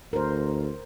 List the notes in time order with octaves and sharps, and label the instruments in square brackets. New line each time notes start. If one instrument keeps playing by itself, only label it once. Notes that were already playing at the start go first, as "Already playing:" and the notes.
[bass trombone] D2 [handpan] A#4 C5